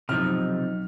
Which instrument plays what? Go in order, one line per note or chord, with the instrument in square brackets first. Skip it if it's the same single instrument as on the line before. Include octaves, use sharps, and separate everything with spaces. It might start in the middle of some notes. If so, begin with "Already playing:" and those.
[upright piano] B1 D#4 F6 [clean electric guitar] C3 F3